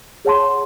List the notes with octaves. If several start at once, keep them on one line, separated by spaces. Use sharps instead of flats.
G#4 C#5 F#5 A5 C6